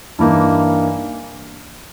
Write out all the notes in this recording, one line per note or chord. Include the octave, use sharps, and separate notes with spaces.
G2 E3 A#3 D#4